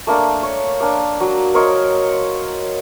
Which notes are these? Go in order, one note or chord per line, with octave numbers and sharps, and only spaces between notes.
A3 A#3 D4
C#5
A#3 D4
F#3
A#4 C5 C#5 D#5